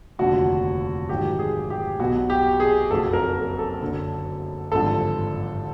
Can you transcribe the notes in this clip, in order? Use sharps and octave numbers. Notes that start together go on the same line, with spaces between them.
F1 D#2 D3 F3 F#4
A#1 G#2 D#3 F#3 G4
G#4
G4
B1 B2 F#3 F#4
G4
G#4
F#1 F2 C#3 F#3 A4
A#4
A#4
A4
F#1 F#2 D3
G#1 G2 D3 F3 A4